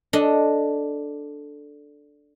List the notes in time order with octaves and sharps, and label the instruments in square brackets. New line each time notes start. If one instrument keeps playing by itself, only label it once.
[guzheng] D4 A4 D#5